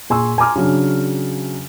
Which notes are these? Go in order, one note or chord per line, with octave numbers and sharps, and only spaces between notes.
A#2 G#4 G#5 C6 C#6 E6
G#5 A#5 C6 D6 F6
C#3 F#3 D4